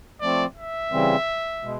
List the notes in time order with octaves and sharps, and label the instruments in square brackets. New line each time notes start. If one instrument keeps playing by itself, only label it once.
[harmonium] F3 A3 C4 [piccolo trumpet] D5
[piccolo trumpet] E5
[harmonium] C#3 E3 G3 C4
B2 G#3